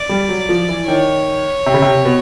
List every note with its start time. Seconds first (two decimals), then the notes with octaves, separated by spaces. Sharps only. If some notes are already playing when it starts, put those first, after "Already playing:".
Already playing: D5
0.09 G3
0.29 F#3
0.49 F3
0.69 E3
0.88 D#3 C#5
1.66 C3
1.74 C#3
1.82 C3
2.05 B2